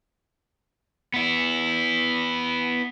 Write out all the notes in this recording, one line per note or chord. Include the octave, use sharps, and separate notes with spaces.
B3 E4